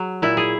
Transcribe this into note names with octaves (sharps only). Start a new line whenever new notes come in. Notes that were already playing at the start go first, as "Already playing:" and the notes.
Already playing: F#3 G#4
A#2 E4
G#4